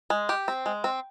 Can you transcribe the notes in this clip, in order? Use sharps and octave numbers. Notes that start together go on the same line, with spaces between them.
G#3
G4
C4
G#3
C4